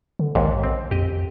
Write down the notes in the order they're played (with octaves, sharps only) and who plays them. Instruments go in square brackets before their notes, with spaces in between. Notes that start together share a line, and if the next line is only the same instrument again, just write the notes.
[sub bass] D3
[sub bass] A#1 [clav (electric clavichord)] D#2 G#2
[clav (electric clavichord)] C4
[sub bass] F2 [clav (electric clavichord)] G4 D#5